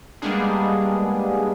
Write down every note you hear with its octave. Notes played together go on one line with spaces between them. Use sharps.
G3 G#3 A#3 B3 D4 G#4